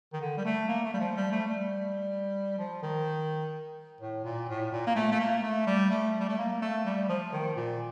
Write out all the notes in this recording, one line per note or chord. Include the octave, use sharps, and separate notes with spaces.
D#3
D3
G3
A3
A#3
A3
G3
F3
G3
A3
G3
F3
D#3
A2
A#2
A2
A#2
A#3
A3
A3
A#3
A3
G3
A3
G3
A3
A#3
A3
G3
F3
D#3
A#2